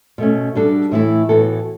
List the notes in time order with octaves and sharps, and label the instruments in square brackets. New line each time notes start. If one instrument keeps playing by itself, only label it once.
[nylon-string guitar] B2 A3 C#4
G3 D4 F#4 A4
A2 E3 A3 E4
A2 E3 B3 F#4 A4